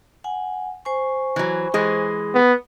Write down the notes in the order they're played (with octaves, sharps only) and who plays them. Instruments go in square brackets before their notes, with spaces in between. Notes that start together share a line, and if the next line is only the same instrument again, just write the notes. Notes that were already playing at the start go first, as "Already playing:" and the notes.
[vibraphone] F#5 G#5
C5 G#5 C#6
[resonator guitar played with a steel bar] E3 F#3
E3 G#3 G#4
[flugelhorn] B3